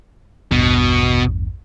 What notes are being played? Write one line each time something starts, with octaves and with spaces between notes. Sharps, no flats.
A1 E2 G2 B2